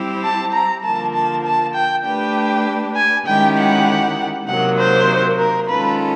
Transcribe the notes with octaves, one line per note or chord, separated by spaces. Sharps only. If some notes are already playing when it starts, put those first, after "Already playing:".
Already playing: G3 C4 E4 G4 C5
A5
A#5
D3 F3 A#3 A5
A5
A5
G5
A3 D4 G4 B4 G5
G#5
D#3 G#3 C#4 E4 G4 G5
F#5
C3 D#3 F#3 A#3 F#5
C5
A#4
D#3 G#3 C#4 F4 A4 B4